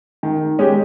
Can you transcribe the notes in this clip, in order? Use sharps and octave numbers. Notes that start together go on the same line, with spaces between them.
D#3
G#3 C#4 G4